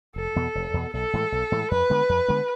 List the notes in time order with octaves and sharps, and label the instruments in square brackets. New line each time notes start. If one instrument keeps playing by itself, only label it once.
[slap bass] F1 [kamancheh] A4
[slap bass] E2 B2 B3
F1
E2 B2 B3
[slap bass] B1 [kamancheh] A4
[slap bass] A2 E3 G#3
B1
A2 E3 G#3
[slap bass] F2 [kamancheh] B4
[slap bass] D3 G#3 B3
F2
D3 G#3 B3